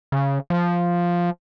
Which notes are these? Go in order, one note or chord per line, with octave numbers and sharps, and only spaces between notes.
C#3
F3